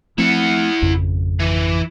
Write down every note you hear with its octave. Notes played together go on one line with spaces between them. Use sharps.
F3 A3 C4 E4 F#5
G#1 F2 C#3
E3